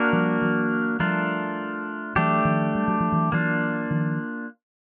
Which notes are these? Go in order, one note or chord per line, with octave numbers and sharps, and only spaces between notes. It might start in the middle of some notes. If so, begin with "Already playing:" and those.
Already playing: A#3 D4 F#4 A#4
F3 G3
E3 F#3
F3 G3 A3 D4 F4 A#4
E3 F#3 A3 D4 G4
D#3 F3
G3
F#3
F3
E3 F#3
E3 F#3 A#3 D4 F4
D#3 F3